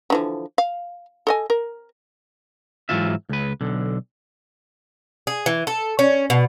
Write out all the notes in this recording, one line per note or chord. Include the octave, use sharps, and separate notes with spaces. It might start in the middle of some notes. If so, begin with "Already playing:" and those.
D3 E3 F3
F5
A4 D#5 G#5
A#4
G#2 E3 F#3 F4 E5
C#2 B4
B1 D3
G#4
E3
A4
C#4
B2